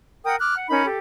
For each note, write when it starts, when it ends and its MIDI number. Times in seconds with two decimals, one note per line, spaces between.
0.25 0.36 70
0.25 0.36 78
0.25 0.36 79
0.25 0.36 87
0.39 0.55 86
0.39 0.55 89
0.39 0.55 90
0.56 0.67 78
0.69 0.85 61
0.69 0.85 63
0.69 0.85 70
0.69 0.85 83
0.85 0.98 67
0.85 0.98 69